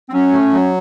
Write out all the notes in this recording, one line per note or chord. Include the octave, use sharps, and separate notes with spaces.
C4
F#3 C#4
A3
F#3